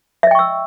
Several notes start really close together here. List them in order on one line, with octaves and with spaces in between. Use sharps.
E5 D#5 G5 C#6 E6